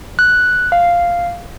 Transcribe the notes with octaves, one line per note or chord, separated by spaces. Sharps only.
F#6
F5